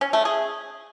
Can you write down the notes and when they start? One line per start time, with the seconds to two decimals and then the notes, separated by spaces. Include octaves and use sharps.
0.01 C#4
0.13 A3
0.25 G#4